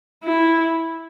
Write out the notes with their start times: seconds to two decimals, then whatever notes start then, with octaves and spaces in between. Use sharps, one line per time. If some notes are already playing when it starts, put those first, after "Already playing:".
0.24 E4